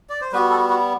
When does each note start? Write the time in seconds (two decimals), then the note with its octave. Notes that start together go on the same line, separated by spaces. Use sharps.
0.10 D5
0.21 C5
0.32 G3 B3 F#4 B4
0.51 A4
0.70 F#4